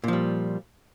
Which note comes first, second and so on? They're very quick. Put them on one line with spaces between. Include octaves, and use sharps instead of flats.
A#2 F3 G3